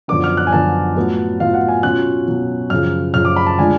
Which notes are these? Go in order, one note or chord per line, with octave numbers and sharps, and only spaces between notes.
F#2 D3 F3 B3 D4 D6
F6
F#6
G#5
F#2 D3 F3 B3 D4 A5
A2 F#3 B3 F4
A2 F#3 B3 F4 F5
F#5
G#5
B2 F#3 C#4 F4 F#6
B2 F#3 C#4 F4
F#2 C#3 F3 F6
F#2 C#3 F3 F6
D6
B5
A5
D3 G#3 D4 F4 G#5